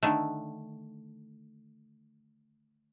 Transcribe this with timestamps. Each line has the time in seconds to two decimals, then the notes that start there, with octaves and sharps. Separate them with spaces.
0.03 D3 D#3 A3